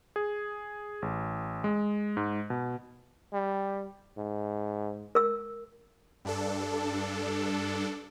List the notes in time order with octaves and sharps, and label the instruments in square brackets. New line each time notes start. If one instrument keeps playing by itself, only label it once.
[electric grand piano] G#4
A1
G#3
G#2
B2
[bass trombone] G3
G#2
[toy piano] A#4 E6
[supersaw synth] G2 D4 A4